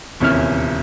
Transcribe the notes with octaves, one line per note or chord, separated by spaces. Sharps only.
D#1 E2 C3 C#4 E4 F6